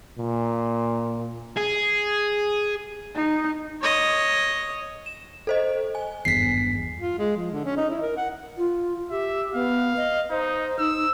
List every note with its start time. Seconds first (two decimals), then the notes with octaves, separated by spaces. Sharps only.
0.19 A#2
1.57 G#4
3.15 D#4
3.82 C#5 D#5
5.06 E7
5.47 A4 C5 D#5
5.95 G#5
6.25 G#1 E2 G2 B6 C7
7.00 F4
7.18 G#3
7.36 F3
7.52 D3
7.65 C#4
7.77 D#4
7.90 E4
8.02 A#4
8.17 F#5
8.57 F4
9.11 G4 E5
9.54 B3 F5
9.97 D#5
10.31 D#4 C5
10.79 D#4 E6